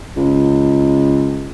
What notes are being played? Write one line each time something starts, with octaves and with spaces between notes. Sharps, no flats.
C#2